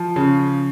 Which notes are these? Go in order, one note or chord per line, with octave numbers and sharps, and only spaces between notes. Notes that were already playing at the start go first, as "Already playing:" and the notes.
Already playing: F3
C#3